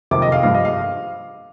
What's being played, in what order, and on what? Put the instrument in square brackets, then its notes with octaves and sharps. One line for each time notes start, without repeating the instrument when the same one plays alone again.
[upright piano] F2 C3 D#3 D6
D#5
F5
G2 F3 F5
D#5
F5